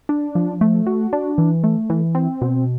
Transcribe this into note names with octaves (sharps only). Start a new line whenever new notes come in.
D4
F3
A3
F#4
D4
E3
A3
E3
C4
B2